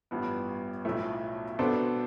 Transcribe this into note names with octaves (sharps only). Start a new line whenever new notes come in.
A1 G2 F3 B3
B1 A2 F3 A3
B2 B3 D4 A4 C5